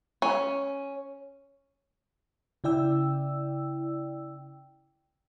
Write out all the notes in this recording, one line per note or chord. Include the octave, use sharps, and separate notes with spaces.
C#4
C#3 E4 D5 G5 E6